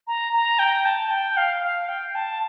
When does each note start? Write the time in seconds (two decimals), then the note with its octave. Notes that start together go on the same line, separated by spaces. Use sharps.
0.07 A#5
0.33 A#5
0.59 G5
0.85 A5
1.11 G5
1.37 F5
1.63 F5
1.89 G5
2.15 A5